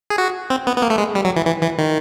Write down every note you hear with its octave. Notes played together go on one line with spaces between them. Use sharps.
G#4
F#4
C4
B3
B3
A#3
A3
G#3
G3
F#3
E3
E3
E3
D#3